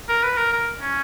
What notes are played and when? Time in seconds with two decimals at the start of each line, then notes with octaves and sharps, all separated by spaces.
0.09 A#4
0.24 B4
0.37 A#4
0.53 A#4
0.82 C#4